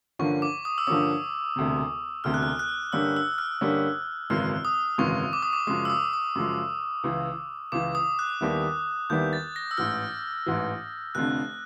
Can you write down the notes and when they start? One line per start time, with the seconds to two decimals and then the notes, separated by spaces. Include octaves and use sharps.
0.19 G2 D3 F3 A#3 C#4 C#6
0.42 D6
0.65 D#6
0.78 E6
0.87 G2 D3 F3 A#3 C#4 D#6
1.56 E1 D2 C3
2.24 E1 D2 C3 F6
2.34 F#6
2.43 F6
2.59 F#6
2.92 G2 D3 G3 A#3 C#4 E6
3.16 E6
3.38 F6
3.61 G2 D3 G3 A#3 C#4
4.30 G#1 F#2 C#3 E3 G#3 F6
4.65 D#6
4.98 G#1 F#2 C#3 E3 G#3 C#6
5.33 D6
5.43 D#6
5.53 D6
5.67 F#2 C#3 F3 G#3 D#6
5.85 E6
5.90 D#6
6.13 D#6
6.35 F#2 C#3 F3 G#3
7.04 C#2 C#3 E3
7.72 C#2 C#3 E3 D6
7.95 D#6
8.19 F#6
8.41 D#2 D#3 G3 B3 E4
9.10 D#2 D#3 G3 B3 E4 G6
9.33 A6
9.56 A#6
9.71 E6
9.78 A1 G#2 E3 F6
10.46 A1 G#2 E3
11.15 F1 F2 D3 F#6